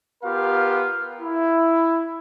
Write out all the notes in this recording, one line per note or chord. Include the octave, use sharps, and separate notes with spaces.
B3 F4 G4 A#4 F5
E4